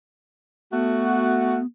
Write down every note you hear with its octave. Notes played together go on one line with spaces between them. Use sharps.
A3 B3 F#4